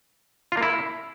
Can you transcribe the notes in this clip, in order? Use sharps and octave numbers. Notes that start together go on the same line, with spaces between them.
F4
A#3
E4